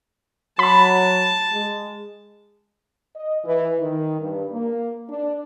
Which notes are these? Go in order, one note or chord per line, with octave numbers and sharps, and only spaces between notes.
F#3 A5 B5
G#3
D#5
E3
D#3
G2
A#3
D4